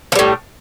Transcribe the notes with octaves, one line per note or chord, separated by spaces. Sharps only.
A2 F3 G3